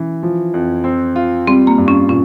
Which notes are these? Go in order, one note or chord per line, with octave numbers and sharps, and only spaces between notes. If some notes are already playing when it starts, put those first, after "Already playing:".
Already playing: E3 C#4
F3
F2
C4
F4
G3 C4
A#3
G2
C#4
A#2 C#4